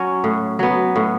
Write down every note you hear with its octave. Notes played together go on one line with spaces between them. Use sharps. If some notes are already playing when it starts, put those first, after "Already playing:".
Already playing: F#3 C#4
A2
F#3 B3
A2